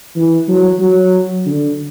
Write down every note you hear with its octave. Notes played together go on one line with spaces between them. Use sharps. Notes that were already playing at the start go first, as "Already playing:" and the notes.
E3
F#3
F#3
D3